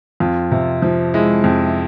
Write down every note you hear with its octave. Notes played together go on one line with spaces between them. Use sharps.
F2 F4
C3
F3
G#3 E4
F2